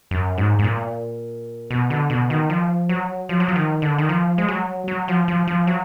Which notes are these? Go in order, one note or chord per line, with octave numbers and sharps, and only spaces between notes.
F#2
G#2
G#2
A#2
B2
D3
B2
D#3
F3
F#3
F3
F#3
F3
D#3
D3
D#3
F3
G#3
F#3
F#3
F3
F3
F3
F#3